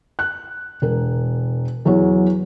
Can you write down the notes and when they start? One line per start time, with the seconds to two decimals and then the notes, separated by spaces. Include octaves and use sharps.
0.19 F#6
0.82 E1 A#4
1.85 E2 F#3 C#5